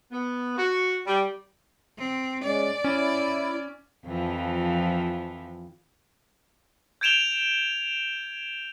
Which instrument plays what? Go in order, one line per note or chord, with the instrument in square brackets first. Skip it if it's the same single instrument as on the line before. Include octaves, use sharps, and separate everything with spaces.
[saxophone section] B3
F#4
G3
[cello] C4
[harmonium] G#3 C#4 [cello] D5
[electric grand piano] C#4 [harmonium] E4
[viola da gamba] F2 E3 F3
[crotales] G6 G#6 D7 E7 F7 G7